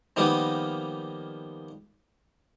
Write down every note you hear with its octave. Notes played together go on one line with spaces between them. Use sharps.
D#3 F3 G3 A#3 B3 D#4